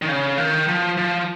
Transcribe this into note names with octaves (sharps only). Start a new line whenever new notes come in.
D#3
C#3
D#3
F3
F3